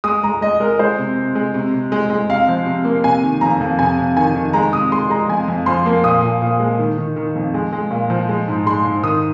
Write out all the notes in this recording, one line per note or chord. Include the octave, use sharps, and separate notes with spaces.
G#3 D#6
G#3 A#5
G#3 D#5
G#3 A#4
G#3 C5
C3
C3
G#3
C3
C3
G#3
G#3
C3 F5
F3
C3
A#3
C3 G#5
D#3
F2 A#5
F2
C3 G#5
C3
D#3 G#5
D#3
G#3 A#5
C3 D#6
G#3 C6
G#3 A#5
F2 G#5
F2
F3 C6
A#3
A#2 D#6
A#2
A#2
G#3
D#3
D#3
D#3
F2
G#3
G#3
A#2
F3
G#3
G#2
G#3 C6
G#2
D#3 D#6